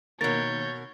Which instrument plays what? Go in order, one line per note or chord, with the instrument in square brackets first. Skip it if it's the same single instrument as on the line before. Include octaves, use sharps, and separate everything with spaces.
[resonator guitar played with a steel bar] B2 A#4 [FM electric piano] D#3 A#3 [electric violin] C#5 G6 [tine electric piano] A6